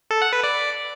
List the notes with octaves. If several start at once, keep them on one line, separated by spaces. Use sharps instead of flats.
A4
F#5
B4
D5